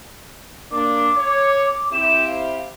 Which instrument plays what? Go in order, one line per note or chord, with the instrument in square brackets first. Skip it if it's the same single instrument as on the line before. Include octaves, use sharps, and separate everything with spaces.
[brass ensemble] A#3 D4 [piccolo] D6
[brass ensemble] C#5
[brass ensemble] C4 E4 G4 [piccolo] E7
[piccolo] F5